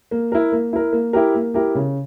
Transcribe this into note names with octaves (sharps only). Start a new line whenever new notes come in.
A#3
E4 A#4
A#3
E4 A#4
A#3
E4 G4 A#4
A#3
E4 G4 A#4
C#3